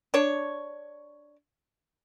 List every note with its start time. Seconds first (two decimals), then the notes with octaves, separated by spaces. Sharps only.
0.14 D4 C#5